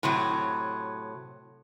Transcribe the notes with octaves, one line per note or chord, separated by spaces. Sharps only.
A2 C3 F#3